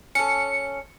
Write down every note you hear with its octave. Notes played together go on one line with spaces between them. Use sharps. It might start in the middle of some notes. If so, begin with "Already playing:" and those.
C#4 A4 C#7